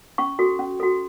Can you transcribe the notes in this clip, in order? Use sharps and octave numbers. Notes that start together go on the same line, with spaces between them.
C#4 C#6
F#4 A4
C#4
F#4 A4